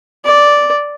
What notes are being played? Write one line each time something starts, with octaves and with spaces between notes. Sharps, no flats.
D5